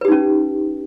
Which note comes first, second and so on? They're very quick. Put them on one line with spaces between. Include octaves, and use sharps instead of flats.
B4 G4 D#4 C#4